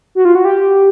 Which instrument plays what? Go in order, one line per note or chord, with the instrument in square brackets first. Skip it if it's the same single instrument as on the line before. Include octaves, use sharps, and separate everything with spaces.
[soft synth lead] F#4
F4
F#4
G4